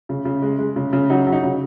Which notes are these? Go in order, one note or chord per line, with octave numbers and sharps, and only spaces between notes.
C#3
C#3
G#3
G#3
C#3
C#3
F#3 D#4
F#3
D#4
C#3